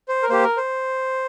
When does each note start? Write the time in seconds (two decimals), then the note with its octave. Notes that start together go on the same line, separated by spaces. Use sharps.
0.08 C5
0.22 A#4
0.29 A#3 G4 C5
0.44 A#4
0.57 C5